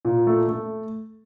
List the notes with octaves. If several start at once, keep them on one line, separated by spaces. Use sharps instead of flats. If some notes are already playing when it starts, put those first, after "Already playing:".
A#2
A3
A3